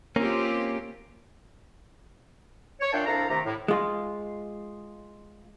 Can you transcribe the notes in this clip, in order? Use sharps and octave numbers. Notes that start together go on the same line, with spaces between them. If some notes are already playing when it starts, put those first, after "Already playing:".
A#3 C4 C#4 F4 G4
C#5
A#2 D4 E5 F5 G5 A5
C2 D4 A4 F5 A#5
C3 D#3 A3 G4 A#5
A2
G#3 F4